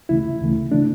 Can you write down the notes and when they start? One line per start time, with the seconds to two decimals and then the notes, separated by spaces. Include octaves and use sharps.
0.09 D2 C#3 E3 A3 E4
0.41 D2 C#3 E3 A3
0.72 C#3 E3 A3 D4